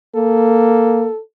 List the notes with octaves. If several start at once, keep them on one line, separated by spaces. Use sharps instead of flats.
A#3 A4